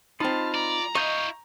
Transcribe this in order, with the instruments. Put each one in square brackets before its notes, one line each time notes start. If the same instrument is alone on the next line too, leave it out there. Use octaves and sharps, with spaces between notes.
[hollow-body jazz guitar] C4 D#4 [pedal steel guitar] F4 B5 [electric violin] A5 F6
[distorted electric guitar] D5 [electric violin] A#5
[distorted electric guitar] E4 F5 [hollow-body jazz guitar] D#5 [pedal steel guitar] C#6 G6